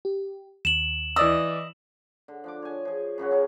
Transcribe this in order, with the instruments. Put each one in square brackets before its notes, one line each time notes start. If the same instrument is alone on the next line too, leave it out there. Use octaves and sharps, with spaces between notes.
[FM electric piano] G4
[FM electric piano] D#2 [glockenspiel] E7 F#7
[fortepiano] E3 D5 E6 [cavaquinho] D#5
[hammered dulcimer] D3
F3 D4 D6
C#5 G#5
F3 G#4
F#2 C#3 C#4 F#4
C#4 G#4 A#4 C#5